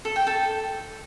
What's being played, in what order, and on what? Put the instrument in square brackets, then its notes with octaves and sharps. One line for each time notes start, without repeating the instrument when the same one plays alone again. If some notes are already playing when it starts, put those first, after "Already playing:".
[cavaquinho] A4
G5
A4